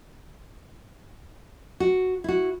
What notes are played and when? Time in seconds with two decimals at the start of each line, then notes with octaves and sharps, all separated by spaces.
1.80 F#4
2.24 E4 F#4